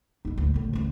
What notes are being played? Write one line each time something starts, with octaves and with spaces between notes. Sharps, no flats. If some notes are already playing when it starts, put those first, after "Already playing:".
A1 D#4
D2
C2 A2
A1 D2